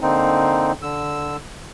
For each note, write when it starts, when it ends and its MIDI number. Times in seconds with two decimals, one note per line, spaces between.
0.01 0.72 50
0.01 0.72 58
0.01 0.72 60
0.01 0.72 63
0.82 1.36 50
0.82 1.36 88